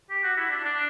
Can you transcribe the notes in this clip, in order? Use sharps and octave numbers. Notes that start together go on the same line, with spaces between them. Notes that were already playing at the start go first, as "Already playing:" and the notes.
G4
F#4
E4
D4
D4